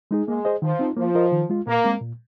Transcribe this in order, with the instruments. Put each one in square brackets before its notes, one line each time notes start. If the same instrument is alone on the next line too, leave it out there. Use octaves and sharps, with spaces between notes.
[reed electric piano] G#3 D#4 G#4
[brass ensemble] G#3 [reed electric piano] A#3
[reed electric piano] G#4 C5 D#5
[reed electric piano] D#3 [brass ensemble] F3
[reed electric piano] C4 D#4
[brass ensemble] F3 [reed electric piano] A#3
[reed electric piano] F4 A#4 D#5
D#3
G#3 F4
[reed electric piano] A#2 [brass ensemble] A#3
[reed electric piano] G#3 C4
A#2